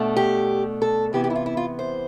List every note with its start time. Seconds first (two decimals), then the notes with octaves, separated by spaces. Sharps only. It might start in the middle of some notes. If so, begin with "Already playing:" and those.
Already playing: B2 A3 D4
0.16 G4
0.82 A4
1.13 C3 E3 B3 E4 G4
1.24 G4
1.30 E4
1.35 F4
1.46 E4
1.57 F4
1.79 C5